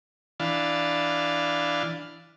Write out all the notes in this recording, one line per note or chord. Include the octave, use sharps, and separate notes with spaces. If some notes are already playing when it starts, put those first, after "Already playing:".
E3 D4 F5